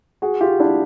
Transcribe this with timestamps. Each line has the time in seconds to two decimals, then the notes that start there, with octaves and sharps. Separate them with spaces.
0.22 F#4 G#4
0.41 F4 G4
0.59 D4 E4